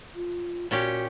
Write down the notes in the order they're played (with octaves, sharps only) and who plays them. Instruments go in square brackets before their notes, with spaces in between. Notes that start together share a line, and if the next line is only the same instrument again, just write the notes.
[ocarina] F4
[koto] A#2 C#4 G4 [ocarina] F#4